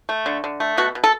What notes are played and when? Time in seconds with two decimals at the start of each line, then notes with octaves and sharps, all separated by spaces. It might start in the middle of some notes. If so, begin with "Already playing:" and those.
0.09 A3
0.26 D3
0.44 D3
0.60 A3
0.77 B2 F#4
0.95 B2
1.04 A4